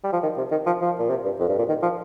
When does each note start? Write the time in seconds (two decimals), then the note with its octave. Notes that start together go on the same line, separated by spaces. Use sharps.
0.04 G3
0.13 F3
0.23 D#3
0.37 C3
0.51 D#3
0.66 F3
0.81 F3
0.99 A#2
1.10 C3
1.24 G2
1.39 F2
1.49 G2
1.58 A#2
1.69 D#3
1.83 F3